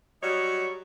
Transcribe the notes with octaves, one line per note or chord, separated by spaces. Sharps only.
F#3 G3 D#4 F#4 C#5